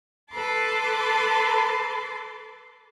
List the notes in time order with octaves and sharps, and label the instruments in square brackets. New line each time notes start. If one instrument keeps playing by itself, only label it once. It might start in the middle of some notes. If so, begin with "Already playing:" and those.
[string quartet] A4 B4 A5 C6 D6